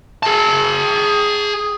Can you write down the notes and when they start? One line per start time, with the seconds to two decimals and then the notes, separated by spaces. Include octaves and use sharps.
0.23 G#4 A5